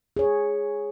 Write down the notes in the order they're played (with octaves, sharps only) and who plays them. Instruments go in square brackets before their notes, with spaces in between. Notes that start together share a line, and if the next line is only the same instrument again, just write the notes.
[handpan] G#4 C#5